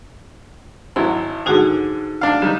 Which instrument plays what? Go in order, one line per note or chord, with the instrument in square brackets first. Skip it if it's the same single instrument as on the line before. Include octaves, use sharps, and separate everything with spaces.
[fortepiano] G#1 F#3 E4 [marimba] C6
[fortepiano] G#2 D3 [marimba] D#4 F#4 G#4
[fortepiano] D4 F5
[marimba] D3 [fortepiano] G3 D#4